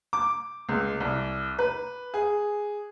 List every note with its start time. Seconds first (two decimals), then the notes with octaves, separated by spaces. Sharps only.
0.13 D6
0.69 C#2
1.00 C2
1.59 B4
2.14 G#4